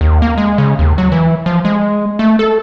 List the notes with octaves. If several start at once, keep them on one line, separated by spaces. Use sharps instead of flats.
D#2
A#3
G#3
C#3
D#2
F#3
E3
F3
G#3
A3
A4